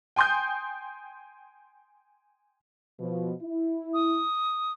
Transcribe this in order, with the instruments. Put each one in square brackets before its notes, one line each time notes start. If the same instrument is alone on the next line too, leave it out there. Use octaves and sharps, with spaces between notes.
[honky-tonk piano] G5 G#5 C6 D#6 G6
[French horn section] B2 F3
E4
[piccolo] D#6